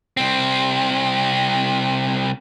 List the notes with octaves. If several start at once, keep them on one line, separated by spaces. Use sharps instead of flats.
C2 C4